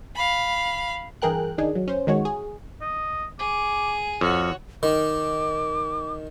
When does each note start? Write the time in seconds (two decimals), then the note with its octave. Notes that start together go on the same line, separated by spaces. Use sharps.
0.15 F5 B5
1.22 G2 E3 G#4 A#4 G5 F#6
1.58 D#3 D4 D#4 G#4
1.75 F#3
1.88 C#4 C5
2.07 D#3 G#3 F#4 C#5
2.25 G#4
2.82 D#5
3.39 G#4 D6
4.21 F2 F#4 C#5 F5
4.83 D#3 D6